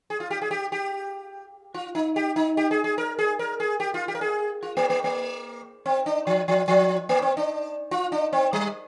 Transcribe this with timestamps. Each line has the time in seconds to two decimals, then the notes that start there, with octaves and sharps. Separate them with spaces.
0.10 G#4
0.20 F4
0.31 G4
0.42 G#4
0.51 G4
0.72 G4
1.74 F4
1.95 D#4
2.16 G4
2.36 D#4
2.57 G4
2.71 G#4
2.84 G#4
2.98 A#4
3.19 G#4
3.39 A#4
3.60 G#4
3.80 G4
3.94 F4
4.08 G4
4.15 A#4
4.21 G#4
4.62 F4
4.77 A#3
4.90 A#3
5.04 A#3
5.86 C4
6.06 D4
6.27 F3
6.48 F3
6.68 F3
7.09 A#3
7.22 C4
7.37 D4
7.91 F4
8.12 D4
8.33 C4
8.53 G3